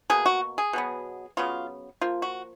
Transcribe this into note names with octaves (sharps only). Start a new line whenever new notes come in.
B2 A#3 G#4
F#4
G#4
B2 F#3 B3
C#3 F#3 B3 F4
F3 A#3 F4
F#4